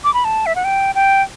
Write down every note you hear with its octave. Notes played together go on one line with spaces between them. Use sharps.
D6
B5
A5
E5
F#5
G5
G5